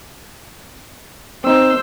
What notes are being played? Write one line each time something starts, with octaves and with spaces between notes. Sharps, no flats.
C4 D#4 C5 E6